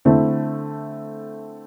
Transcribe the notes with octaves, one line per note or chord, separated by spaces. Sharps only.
D3 A3 C4 E4